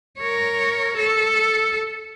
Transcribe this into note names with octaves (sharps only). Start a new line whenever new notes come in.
A#4 C#5
A4